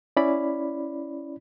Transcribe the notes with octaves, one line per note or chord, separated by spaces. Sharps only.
C#4 E4 D5 B5